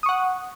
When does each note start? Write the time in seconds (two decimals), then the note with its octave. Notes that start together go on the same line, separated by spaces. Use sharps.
0.03 D#6
0.06 C#6
0.09 F#5